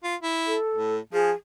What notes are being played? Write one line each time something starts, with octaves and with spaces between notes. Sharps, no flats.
F4
E4
A4
A2
F3 G#4